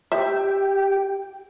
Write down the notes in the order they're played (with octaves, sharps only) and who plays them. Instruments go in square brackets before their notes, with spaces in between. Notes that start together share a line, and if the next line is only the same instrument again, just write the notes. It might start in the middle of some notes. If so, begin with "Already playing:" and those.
[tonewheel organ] G4 G5 [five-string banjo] E5